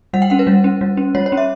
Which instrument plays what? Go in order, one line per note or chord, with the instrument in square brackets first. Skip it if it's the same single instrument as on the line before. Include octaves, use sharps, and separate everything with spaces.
[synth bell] G3 F#5
G5
C#4 F#5
B4
G3
C#4
G3
C#4
G3 C#5
C#5
C#4
E5